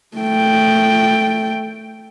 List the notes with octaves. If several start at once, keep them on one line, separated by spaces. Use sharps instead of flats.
A3 G5